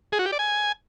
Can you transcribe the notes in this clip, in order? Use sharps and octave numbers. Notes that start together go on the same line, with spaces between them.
G#4
F#4
G4
D5
G#5